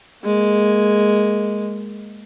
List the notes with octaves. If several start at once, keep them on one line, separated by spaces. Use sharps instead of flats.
G#3 A#3